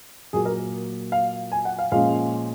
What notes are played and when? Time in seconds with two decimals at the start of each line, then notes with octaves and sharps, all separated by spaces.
0.33 A#2 F#3 A#3 G#4
0.45 A#4
1.12 F5
1.52 G#5
1.65 F#5
1.79 F5
1.92 A#2 F3 G#3 C#4 F5